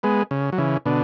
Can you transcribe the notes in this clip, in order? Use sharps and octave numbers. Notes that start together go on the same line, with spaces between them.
G#3 B3
C#3
F#3
C#3 E3
B2 D3